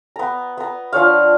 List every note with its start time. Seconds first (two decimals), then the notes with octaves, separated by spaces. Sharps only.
0.16 B3 A#5
0.57 B3 A#5
0.93 F3 D4 C#5 F5